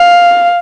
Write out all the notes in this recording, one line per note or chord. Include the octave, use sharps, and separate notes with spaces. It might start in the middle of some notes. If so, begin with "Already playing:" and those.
Already playing: F5